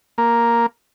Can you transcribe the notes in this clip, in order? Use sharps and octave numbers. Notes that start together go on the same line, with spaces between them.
A#3